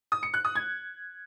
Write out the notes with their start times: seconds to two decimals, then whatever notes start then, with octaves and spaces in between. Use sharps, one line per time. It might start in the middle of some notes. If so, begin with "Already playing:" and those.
0.12 D#6
0.23 C#7
0.34 F#6
0.45 D#6
0.55 G#6